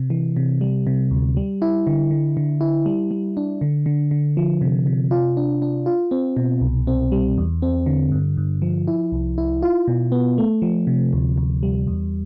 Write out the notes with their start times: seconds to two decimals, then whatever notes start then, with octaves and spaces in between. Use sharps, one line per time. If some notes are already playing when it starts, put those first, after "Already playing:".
Already playing: C3
0.10 E3
0.37 C3
0.61 G3
0.87 C3
1.11 D2
1.37 G3
1.62 E4
1.87 D3
2.11 D3
2.37 D3
2.61 E4
2.86 G3
3.11 G3
3.37 D4
3.61 D3
3.86 D3
4.11 D3
4.37 F3
4.61 C3
4.87 C3
5.11 F4
5.37 D4
5.62 D4
5.86 F4
6.11 C4
6.37 B2
6.61 C2
6.87 C4
7.12 G3
7.38 E2
7.62 C4
7.86 D3
8.11 G2
8.37 G2
8.62 F3
8.87 E4
9.12 C2
9.38 E4
9.62 F4
9.88 B2
10.12 B3
10.38 A3
10.62 F3
10.87 C3
11.13 D2
11.38 D2
11.63 G3
11.87 E2